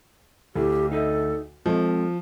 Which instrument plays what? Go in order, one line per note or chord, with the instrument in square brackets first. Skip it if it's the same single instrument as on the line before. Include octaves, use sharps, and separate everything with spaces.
[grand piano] D2 [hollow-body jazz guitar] E4 A4 [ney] G4
[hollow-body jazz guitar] D#4 D#5 E5 [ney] A4
[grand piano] F3 [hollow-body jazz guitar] G#3 A4 [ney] C4